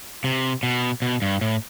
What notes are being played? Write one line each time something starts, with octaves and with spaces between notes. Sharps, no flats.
C3
B2
B2
G2
A2